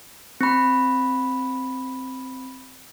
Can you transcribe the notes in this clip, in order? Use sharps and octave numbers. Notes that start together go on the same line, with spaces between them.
C4 B5